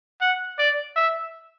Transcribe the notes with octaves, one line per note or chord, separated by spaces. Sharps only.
F#5
D5
E5